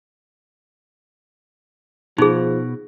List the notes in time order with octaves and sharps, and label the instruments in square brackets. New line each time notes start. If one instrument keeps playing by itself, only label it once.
[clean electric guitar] B2 [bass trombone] F3 [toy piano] D#4 G#4